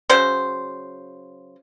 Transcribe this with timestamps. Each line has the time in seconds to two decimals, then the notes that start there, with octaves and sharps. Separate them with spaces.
0.09 C#3 F#3 C5